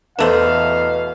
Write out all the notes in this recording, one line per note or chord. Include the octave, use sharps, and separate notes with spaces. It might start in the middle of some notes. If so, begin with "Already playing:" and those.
E2 B2 E3 A3 B3 C5 F5 E7